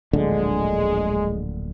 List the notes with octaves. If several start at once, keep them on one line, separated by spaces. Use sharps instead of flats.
D1 A#1 D3 G#3